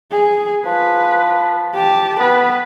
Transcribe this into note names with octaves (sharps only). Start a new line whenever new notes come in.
G#4
F3 B4
G4 A5
B3 B4